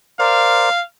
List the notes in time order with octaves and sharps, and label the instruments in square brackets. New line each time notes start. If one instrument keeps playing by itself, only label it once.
[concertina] A#4 C5 D5 [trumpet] F5